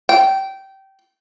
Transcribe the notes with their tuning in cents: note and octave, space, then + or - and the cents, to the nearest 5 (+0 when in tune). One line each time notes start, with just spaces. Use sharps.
G5 -20